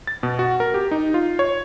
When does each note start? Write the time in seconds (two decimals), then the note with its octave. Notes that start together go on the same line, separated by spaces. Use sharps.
0.07 A6
0.23 B2
0.39 F#4
0.60 A#4
0.74 G4
0.91 D#4
1.14 F4
1.39 C#5